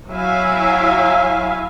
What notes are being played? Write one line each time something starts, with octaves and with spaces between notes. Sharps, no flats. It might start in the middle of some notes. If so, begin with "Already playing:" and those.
F#3 E4 E5 F5 G#5